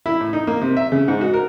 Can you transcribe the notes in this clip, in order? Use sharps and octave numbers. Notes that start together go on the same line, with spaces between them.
E4
A2
D#4
A#3
C3
E5
C#3
G#2
F#4
A#4